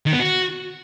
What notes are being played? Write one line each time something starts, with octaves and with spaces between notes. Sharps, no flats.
D#3
B3
F#4